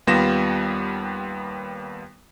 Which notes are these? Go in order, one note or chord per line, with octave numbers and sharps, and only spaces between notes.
D#2 G3 B3 F4 A#6 E7